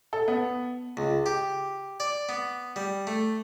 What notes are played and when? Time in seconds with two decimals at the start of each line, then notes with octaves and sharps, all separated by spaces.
0.13 A4
0.28 B3
0.97 C#2
1.26 G4
2.00 D5
2.29 B3
2.76 G3
3.07 A3